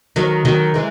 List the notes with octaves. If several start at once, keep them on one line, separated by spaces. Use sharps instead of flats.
D#3 F#3
D#3 F#3
E3 G#3